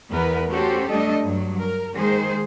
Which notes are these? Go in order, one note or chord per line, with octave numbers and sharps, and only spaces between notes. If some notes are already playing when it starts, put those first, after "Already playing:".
E2 B3 A#4 B4
A3 C#4 F#4 G4 A4 C5
G3 A3 D4 A4 D#5
G2 F#3
A#4
D#3 G#3 A#3 G#4 C5